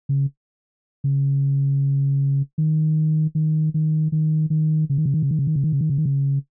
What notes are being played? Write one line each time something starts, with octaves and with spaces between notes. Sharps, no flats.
C#3
C#3
D#3
D#3
D#3
D#3
D#3
C#3
D#3
C#3
D#3
C#3
D#3
C#3
D#3
C#3
D#3
C#3
D#3
C#3
D#3
C#3